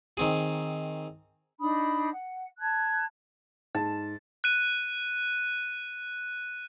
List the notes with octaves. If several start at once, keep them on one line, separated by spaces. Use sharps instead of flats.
D#3 C4 G#4
D4 D#4 B5 D#6
F#5
A5 F#6 G#6
G#2 A5
F#6 D#7